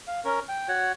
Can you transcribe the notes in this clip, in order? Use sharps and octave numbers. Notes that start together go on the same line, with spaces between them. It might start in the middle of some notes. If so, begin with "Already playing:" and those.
F5
C#4 A#4
G5
F#4 C#5 F#5